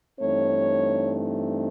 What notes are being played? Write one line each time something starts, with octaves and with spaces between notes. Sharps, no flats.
G2 E3 A3 C4 D#4 C#5